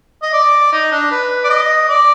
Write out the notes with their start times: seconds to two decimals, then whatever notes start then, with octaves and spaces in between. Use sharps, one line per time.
0.23 D#5
0.33 D5
0.73 D#4
0.92 D4
1.11 B4
1.44 D5
1.50 D#5
1.89 D5